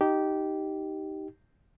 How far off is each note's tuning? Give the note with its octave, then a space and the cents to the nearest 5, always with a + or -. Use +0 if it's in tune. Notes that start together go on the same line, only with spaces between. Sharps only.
D#4 +0 G4 -15